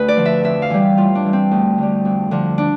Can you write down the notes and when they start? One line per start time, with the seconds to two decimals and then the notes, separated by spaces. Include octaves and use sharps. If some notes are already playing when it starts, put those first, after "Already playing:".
Already playing: D2 B4
0.08 D5
0.17 D3 F3
0.25 E5
0.44 F2 E5
0.62 F5
0.70 E3 G3
0.97 A2 F4
1.15 D4
1.25 E3 G3
1.33 C4
1.51 D2
1.78 D3 G3
2.05 F2
2.31 D3 F3
2.58 D4